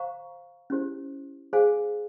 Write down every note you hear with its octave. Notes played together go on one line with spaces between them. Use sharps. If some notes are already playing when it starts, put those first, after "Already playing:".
Already playing: C5 F5 A#5 C#6
C#4 E4 G4 C5
G#4 C5 F5 G#5